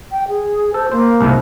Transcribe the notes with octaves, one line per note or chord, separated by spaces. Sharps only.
G5
G#4
A4 C5
A#3 C5
C2 G#2 C3